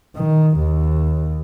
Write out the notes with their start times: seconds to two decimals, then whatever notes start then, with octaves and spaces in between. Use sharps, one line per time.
0.16 D#3
0.58 D#2